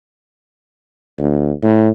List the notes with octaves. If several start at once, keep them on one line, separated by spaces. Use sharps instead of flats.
D2
A2